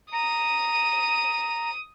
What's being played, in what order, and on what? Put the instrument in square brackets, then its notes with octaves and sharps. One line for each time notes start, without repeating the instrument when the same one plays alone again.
[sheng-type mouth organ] A#5 [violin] D#6 D#7